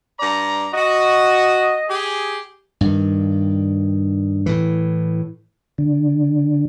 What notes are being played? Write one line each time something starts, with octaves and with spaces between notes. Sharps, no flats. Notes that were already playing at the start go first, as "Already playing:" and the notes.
G2 D5 A#5
F#4 D#5
G4 G#4
G2 D#3
A2 E3
D3